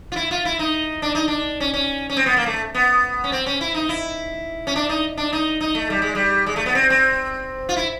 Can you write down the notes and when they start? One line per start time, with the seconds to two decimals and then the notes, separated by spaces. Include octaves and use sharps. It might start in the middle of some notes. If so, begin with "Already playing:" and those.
0.12 F4
0.16 E4
0.31 F4
0.45 E4
0.59 D#4
1.02 D4
1.15 D#4
1.28 D4
1.60 C#4
1.74 C#4
2.10 C#4
2.17 C4
2.26 B3
2.36 A#3
2.46 A3
2.75 B3
3.24 C#4
3.32 C4
3.46 C#4
3.61 E4
3.74 D#4
3.89 E4
4.67 C#4
4.76 D4
4.89 D#4
5.17 D4
5.33 D#4
5.61 D#4
5.75 A3
5.90 G3
6.02 G#3
6.15 G3
6.46 G#3
6.56 A3
6.66 B3
6.75 C4
6.90 C4
7.69 F4
7.77 E4